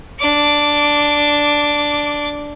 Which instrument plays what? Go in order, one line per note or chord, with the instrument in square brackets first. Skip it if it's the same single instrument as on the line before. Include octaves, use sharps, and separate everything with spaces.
[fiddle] D4 D6